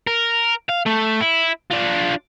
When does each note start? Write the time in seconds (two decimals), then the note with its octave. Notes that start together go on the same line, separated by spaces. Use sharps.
0.07 A#4
0.69 F5
0.86 A3
1.21 E4
1.71 D4 F4